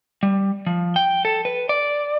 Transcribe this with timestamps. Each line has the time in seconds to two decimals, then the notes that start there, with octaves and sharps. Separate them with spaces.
0.23 G3
0.67 F3
0.96 G5
1.25 A4
1.45 B4
1.69 D5